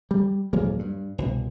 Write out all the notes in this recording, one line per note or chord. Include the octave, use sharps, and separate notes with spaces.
G3
D#1 F#3 G#3 A#3
G2
C2 B2